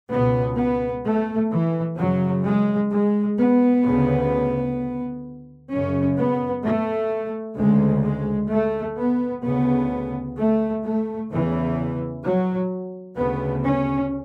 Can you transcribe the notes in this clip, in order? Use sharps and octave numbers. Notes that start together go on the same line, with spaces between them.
C#2 B2 B3
B3
A3
E3
F#2 C#3 F#3
G#3
G#3
B3
D2 C#3
F#2 C#3 C#4
B3
A3
D2 C#3 G#3
G#3
A3
B3
D2 C#3 B3
A3
A3
E2 C#3 E3
F#3
D2 C#3 B3
C#4